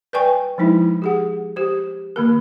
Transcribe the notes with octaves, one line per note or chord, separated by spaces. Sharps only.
B4 D5 G5 G#5 C#6
F3 G#3 D#4 E4
G4 G#4 F#5
G4 C5
D#3 A#3 A#4